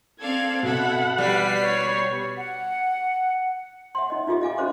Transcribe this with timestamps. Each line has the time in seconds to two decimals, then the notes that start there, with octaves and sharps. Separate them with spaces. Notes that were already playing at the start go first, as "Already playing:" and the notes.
0.21 C4 A4 D5 F5 G#6
0.63 B2 A4 E5 F#5 B5
1.18 G3 B4 B6 C7
1.64 C#5
2.37 F#5
3.95 E5 F#5 C6
4.10 D#4 D#5
4.27 D#4 F4 G4 G#4 D#5 E5
4.42 D#5 F5 G#5 D6
4.58 C#4 F#4 G#4 C5 D6